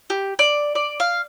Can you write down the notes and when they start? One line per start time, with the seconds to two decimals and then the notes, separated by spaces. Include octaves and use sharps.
0.10 G4
0.39 D5
0.75 D5
1.00 F5